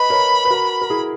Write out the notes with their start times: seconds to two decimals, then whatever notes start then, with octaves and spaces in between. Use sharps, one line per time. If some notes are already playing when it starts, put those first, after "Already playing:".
Already playing: B4 D#5 B5
0.10 A#4 C#5
0.45 B4
0.50 F#4 A#4
0.81 A#4
0.90 E4 G#4